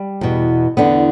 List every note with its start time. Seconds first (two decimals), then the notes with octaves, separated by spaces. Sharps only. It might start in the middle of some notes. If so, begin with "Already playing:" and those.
Already playing: G3
0.21 E2 B2
0.77 E2 D3 B3 D4